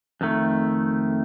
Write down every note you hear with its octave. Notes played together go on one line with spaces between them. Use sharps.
F2 D#3 A3